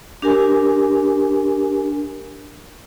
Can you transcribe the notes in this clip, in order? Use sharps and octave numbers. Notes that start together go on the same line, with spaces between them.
D4 G4 A#4 G#5